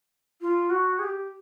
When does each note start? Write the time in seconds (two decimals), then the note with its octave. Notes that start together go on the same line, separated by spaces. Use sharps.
0.41 F4
0.70 F#4
0.99 G#4
1.04 G4